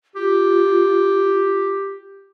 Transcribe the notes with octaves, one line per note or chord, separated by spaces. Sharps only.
F4 G4